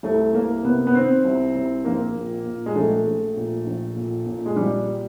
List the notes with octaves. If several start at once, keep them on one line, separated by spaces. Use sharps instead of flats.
C2 A3
C2 A#3
C3 B3
B3
D#3 C4
C2
C2
A#1 A#3
A#2
A#2
G#3
A#1 A3
A#1
A#2
A#1
A#2
A#2
G#3
A#1 G3